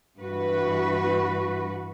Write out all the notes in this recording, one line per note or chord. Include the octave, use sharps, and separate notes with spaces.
G2 E3 F#4 B4